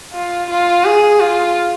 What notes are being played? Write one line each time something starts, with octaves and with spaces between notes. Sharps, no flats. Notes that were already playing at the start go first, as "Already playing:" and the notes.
F4
F4
G#4
F4